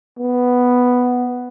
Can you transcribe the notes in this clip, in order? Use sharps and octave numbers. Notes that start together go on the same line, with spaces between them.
B3